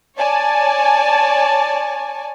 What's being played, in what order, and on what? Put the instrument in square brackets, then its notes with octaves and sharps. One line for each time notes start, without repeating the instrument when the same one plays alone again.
[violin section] C#5 D5 G#5 A5